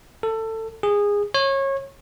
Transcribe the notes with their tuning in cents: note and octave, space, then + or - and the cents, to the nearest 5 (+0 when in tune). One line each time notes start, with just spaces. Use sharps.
A4 +20
G#4 -20
C#5 -25